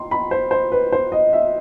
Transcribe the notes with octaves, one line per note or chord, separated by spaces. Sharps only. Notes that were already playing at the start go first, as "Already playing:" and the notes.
Already playing: C6
B5
C5
C5
B4
C5
D#5
E5